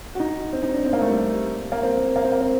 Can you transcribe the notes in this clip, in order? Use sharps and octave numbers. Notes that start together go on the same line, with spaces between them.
F#4
D#4
C4
D#4
D4
C4
A#3
A3
G3
A#3
C4
A#3
C4
A#3
C4